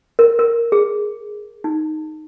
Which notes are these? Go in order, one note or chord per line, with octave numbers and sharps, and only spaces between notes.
A#4
A#4
G#4
D#4